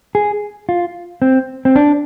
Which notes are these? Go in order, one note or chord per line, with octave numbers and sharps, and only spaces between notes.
G#4
F4
C4
C4
D4